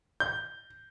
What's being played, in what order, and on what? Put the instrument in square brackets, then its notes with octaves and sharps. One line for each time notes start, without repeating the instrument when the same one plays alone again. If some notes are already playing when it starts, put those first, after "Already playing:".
[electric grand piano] G6